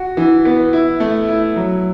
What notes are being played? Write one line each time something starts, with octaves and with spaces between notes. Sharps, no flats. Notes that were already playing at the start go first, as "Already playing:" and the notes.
Already playing: F#4
E3
B3
E4
A3
E4
F#3